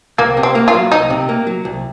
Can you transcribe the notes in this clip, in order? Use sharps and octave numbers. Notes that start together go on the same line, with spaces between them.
C2 A#3
C3
C4
A#3
F4
F#3
C2 D#4
C3
A#3
F#3
C2